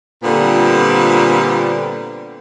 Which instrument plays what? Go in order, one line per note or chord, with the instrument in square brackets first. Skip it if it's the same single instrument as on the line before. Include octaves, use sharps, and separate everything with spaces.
[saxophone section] A#2 D3 G3 B3 C4 F4